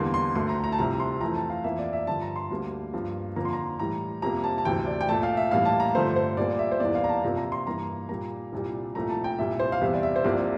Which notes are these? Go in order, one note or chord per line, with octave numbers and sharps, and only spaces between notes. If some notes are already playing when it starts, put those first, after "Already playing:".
Already playing: E2 D3 G3 A#3 C6
C6
D2 D3 A3 C6
A#5
A#5
A5
C2 C3 F3 A#5
C6
F2 E3 A3 A#5
A5
F5
F2 E3 A#3 E5
D5
E5
G2 D3 F3 A5
A#5
C6
D2 D3 G3 A#3
G2 F3 A#3
F2 D3 F3 A#3 A#5
C6
A#5
A2 E3 G3 A#5
F2 C3 G3 A#3 A#5
A5
A5
D2 C3 E3 G5
D5
G5
A#2 A3 A5
F5
E5
A2 E3 G3 A#3 F5
A5
A#5
G2 D3 F3 A3 C5
C5
A#2 G3 A#3 D5
E5
C5
E2 E3 G3 A#3 D5
F5
A#5
A5
F2 C3 F3 A#3 A#5
A#5
C6
G2 E3 A#3 A#5
A#2 G3 A#3 A#5
C2 A#2 G3
C2 A#2 F3 A3 A#5
A5
G5
C2 A#2 G3 E5
C5
F5
E2 C3 E3 G3 E5
D5
E5
C5
C2 C3 F3 A#3 D5